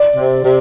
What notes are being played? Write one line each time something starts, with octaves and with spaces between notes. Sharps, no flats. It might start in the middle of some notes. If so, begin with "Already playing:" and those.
Already playing: D5
C3
C3